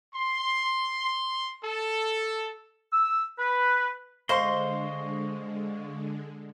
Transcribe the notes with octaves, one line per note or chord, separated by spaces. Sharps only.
C6
A4
E6
B4
D3 G#3 C5 D#5 F5 C6 C#6 C7